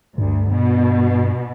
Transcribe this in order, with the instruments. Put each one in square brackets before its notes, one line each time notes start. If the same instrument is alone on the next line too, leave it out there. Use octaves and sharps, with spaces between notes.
[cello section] D2 [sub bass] G2
[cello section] B2